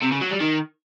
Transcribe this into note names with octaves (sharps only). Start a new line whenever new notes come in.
C3
C#3
F#3
G3
D#3